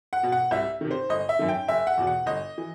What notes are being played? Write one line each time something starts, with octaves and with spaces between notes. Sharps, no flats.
F#5
B2
F#5
C2 E5
C3 D#3
C5
G1 D#5
E5
F#2 D#3
G5
F#1 E5
F#5
E2 B2
F#5
G1 D#5
E3